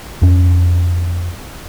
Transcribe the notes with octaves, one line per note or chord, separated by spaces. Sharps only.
F2 C#4